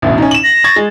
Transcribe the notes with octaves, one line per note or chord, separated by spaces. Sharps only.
A1 D2 B2
C#4 D#4
E7 F#7
A#6
C#6 G#6 A6
G#3